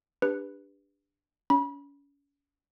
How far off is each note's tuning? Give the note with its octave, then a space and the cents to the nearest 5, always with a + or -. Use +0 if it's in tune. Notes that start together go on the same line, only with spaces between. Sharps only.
D4 +0 G4 +30 B4 +0
C#4 +35 B5 -30